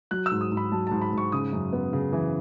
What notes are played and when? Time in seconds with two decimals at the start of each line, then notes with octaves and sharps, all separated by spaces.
0.11 F#3 F#6
0.26 E6
0.31 G#2
0.41 D#6
0.52 G#2
0.57 B5
0.72 F#3 A5
0.87 A5
0.91 G#2
1.02 B5
1.13 G#2 C#6
1.32 C#3 D#6
1.53 F#2
1.73 B3
1.93 C#3
2.13 E3